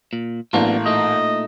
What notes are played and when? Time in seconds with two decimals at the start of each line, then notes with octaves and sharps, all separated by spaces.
0.13 A#2
0.53 A1 F#3 A#3 B3 D4
0.86 A#2 A3 D#4 D#5